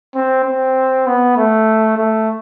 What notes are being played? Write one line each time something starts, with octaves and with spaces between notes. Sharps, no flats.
C4
C4
B3
A3
A3